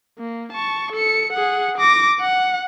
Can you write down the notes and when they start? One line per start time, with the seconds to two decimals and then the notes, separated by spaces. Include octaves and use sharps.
0.19 A#3
0.52 A5 C#6
0.92 A4 C#7
1.32 G#4 F#5
1.78 D6 A#6
2.20 F#5